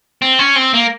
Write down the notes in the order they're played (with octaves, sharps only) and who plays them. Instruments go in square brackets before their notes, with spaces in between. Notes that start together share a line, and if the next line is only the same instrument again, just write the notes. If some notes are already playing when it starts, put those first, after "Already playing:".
[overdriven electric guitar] C4
C#4
C4
A#3